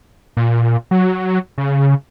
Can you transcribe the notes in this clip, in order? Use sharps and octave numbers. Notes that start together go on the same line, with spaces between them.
A#2
F#3
C#3